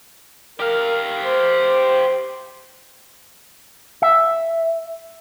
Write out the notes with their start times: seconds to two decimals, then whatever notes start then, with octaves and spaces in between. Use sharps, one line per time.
0.60 G4 A#4 F5
1.23 C5
4.02 E5